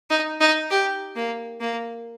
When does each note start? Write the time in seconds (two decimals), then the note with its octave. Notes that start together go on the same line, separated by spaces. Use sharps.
0.10 D#4
0.40 D#4
0.71 G4
1.16 A#3
1.61 A#3